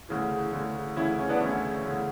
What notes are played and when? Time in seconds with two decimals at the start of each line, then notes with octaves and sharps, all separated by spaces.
0.09 D2 C#3 E3
0.53 D2 C#3 E3
0.96 D2 C#3 E3 C#4 E4
1.19 C#4
1.29 B3 D4
1.40 D2 C#3 E3 C#4 E4
1.85 D2 C#3 E3